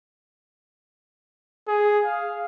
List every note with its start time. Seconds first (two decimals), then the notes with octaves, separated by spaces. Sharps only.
1.68 G#4
2.05 F5